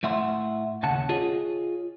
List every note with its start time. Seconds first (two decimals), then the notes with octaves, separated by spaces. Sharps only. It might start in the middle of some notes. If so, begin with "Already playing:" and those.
0.03 A2 A3 E5 F#5 C6
0.83 D#2 C#3 F#5 A5
1.09 F4 G#4 C#5 D#5